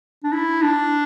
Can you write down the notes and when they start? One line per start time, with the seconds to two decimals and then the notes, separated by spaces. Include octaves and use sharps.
0.24 D4
0.33 E4
0.62 D4